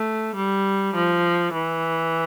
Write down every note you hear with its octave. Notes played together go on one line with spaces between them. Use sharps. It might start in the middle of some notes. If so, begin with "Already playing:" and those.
Already playing: A3
G3
F3
E3